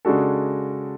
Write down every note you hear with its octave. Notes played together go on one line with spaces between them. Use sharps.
C#3 G#3 D4 F#4 A4